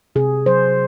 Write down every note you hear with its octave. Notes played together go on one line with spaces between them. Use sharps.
C3 G#4
F#3 C5